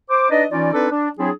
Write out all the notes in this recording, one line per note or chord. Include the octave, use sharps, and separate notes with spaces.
C5 D6
D4 D#4 B4 D5 D#5
E3 C#4 D#4 F4 D5
C4 D4 D#4 A4 B4 D5
D4
F#3 C4 D4 E4 G#4